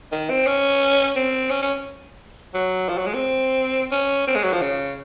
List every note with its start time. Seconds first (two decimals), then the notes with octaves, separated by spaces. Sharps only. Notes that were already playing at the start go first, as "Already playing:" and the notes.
0.12 D#3
0.30 C4
0.46 C#4
1.16 C4
1.51 C#4
1.62 C#4
2.54 F#3
2.88 F3
2.98 F#3
3.06 G#3
3.14 C4
3.92 C#4
4.27 C4
4.35 G#3
4.43 F#3
4.53 F3
4.61 C#3